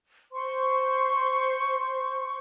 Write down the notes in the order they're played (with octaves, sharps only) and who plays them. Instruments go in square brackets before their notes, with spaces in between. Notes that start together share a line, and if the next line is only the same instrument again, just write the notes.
[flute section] C5 C6 C#6